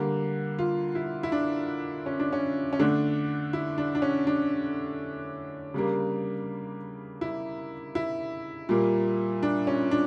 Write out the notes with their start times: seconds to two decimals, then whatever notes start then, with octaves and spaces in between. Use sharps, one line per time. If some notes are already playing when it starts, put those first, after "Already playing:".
Already playing: D3 G3 A#3
0.59 F4
0.95 E4
1.23 E4
1.32 D4
2.06 C#4
2.19 D4
2.33 C#4
2.73 C#4
2.79 D3 A3 D4
3.53 E4
3.78 D4
3.95 D4
4.02 C#4
4.27 D4
5.74 C#3 G3 A#3
7.21 E4
7.95 E4
8.69 A#2 G3 A#3
9.43 D4
9.67 C#4
9.91 D4